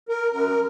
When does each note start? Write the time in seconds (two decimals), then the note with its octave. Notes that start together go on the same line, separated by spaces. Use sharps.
0.09 A#4
0.32 F#2 A#4